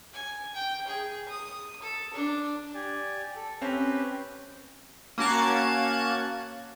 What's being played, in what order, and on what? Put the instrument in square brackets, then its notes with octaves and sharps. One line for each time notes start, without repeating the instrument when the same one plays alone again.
[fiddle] G#5
G5
G#4
D#6
A4
D4
[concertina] G4 D5 G#5
A4
[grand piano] C4 C#4 [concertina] G4 B4
[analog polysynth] A#3 C#4 F#4 A5 F#6 G#6